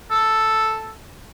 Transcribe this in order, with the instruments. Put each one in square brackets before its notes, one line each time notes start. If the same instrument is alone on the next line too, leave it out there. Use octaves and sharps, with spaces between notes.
[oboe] A4